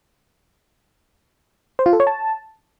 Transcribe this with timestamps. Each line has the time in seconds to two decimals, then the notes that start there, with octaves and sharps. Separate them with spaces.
1.79 C5
1.86 F4
1.93 A4
2.00 C#5
2.07 A5